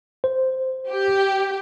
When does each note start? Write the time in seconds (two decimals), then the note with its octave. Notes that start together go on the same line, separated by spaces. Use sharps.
0.24 C5
0.89 G4